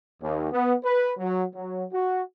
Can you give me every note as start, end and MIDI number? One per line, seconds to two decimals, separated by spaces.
0.20 0.48 39
0.51 0.74 59
0.84 1.12 71
1.17 1.44 54
1.55 1.84 54
1.92 2.22 66